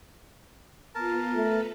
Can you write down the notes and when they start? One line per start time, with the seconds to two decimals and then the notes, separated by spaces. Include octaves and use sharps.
0.95 B3 F4 A#4 A5
1.35 A3 A4 B4 A#5